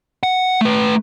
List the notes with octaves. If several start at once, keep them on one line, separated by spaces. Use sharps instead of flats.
F#5
A3 B4